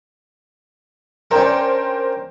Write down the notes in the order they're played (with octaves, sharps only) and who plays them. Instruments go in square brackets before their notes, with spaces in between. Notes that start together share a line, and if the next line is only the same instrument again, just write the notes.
[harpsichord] C#4 D4 [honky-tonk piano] A#4 C5 G5